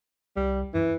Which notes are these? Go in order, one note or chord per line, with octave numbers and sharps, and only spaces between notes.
C2 G3
F#2 E3